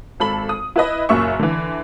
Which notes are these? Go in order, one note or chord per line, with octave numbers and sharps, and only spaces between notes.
G#1 A4 B5 F#7
D#6
E4 B4 D#5
F#1 F#2 A#2 A#3 E5 C#6
D3 E3